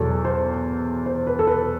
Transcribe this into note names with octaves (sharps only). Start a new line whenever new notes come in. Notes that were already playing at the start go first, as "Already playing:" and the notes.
Already playing: E2 B2 F#3 A4
C5
C5
B4
A4
B4